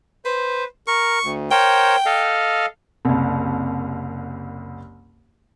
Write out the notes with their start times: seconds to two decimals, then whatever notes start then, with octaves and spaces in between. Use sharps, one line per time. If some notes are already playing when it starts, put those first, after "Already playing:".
0.25 B4 C5
0.87 A#4 C#6
1.24 D2
1.51 A#4 C5 C#5 G5
2.06 A4 D#5 F5
3.05 F#1 C2